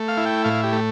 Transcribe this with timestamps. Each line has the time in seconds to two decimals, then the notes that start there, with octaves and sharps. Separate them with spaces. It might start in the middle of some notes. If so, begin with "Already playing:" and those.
Already playing: A3
0.08 F5
0.17 E4
0.26 G5
0.44 A2 F5
0.63 G4
0.73 A3